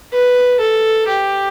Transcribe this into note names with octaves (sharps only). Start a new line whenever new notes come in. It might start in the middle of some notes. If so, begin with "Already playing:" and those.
B4
A4
G4